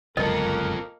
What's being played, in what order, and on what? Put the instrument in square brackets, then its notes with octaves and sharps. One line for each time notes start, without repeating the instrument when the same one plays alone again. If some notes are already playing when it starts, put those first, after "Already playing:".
[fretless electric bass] G1 C#2 F#2 [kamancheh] A#3 A#4 [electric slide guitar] F4 A4 [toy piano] D#5